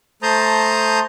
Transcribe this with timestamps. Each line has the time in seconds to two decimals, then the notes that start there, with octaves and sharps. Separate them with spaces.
0.23 A3 C5 A5 A#5 D#6 G6